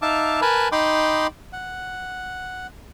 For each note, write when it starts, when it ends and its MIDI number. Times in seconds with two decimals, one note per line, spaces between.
0.02 0.41 63
0.02 0.41 76
0.02 0.41 77
0.02 0.41 81
0.02 0.41 86
0.42 0.68 70
0.42 0.68 71
0.42 0.68 80
0.42 0.68 81
0.42 0.68 83
0.72 1.27 63
0.72 1.27 75
0.72 1.27 79
0.72 1.27 83
0.72 1.27 84
0.72 1.27 86
1.53 2.67 78